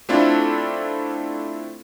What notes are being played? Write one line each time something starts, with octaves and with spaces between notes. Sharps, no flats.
A3 C4 D4 E4 F4 A4